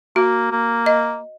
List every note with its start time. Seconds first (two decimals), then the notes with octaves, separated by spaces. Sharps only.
0.16 A#3 F#4
0.51 A#3
0.86 D#5